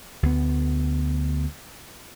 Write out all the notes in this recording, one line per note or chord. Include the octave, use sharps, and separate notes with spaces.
D2 B3